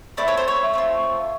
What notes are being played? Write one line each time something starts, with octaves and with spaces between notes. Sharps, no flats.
A3 C4 E4 D5
C#5
C5
C#5
A3 C4 F4